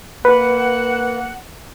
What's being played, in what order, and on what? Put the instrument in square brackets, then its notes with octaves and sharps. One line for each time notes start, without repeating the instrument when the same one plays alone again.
[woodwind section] A#3 F#5 [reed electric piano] B4